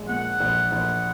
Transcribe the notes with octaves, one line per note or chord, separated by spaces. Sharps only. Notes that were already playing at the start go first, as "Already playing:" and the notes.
Already playing: A#1 G#3
A#2 F#5
A#1
A#1